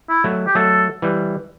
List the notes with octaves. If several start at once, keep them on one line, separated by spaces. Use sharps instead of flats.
E4
F#3 A3
G4
F#3 A3 A4
E3 G3